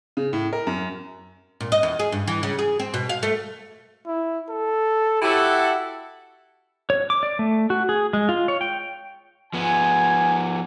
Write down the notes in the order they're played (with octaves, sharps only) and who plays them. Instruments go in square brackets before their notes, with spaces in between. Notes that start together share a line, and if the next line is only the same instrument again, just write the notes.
[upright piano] C#3
A2
A#4
F#2
[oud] A#2
D#5
E2
G#4
G2
E3
C#3
G#4
C4
B2
F5
A3
[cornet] E4
A4
[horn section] E4 F#4 A4 [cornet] G4
[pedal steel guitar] C#5
D6
D5
A3
F#4
G#4
G#3
F4
C#5
G5
[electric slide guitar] F3 B3 [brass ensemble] G#5